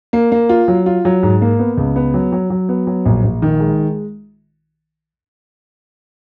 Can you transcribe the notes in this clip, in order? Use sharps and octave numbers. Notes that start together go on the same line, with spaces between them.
A#3
A#3
F4
F#3
F4
F#3
G#2
A#3
B3
C#2
B3
F#3
F#3
F#3
B3
F#3
A#1
A#1
D#3
G#3